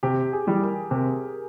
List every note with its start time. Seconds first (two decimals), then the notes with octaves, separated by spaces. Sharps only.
0.03 C3 G4
0.33 G#4
0.47 E3 G3
0.62 A#4
0.91 C3